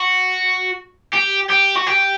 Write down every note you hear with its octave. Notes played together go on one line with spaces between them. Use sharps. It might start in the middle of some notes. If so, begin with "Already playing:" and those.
Already playing: F#4
G4
G4
F#4
G4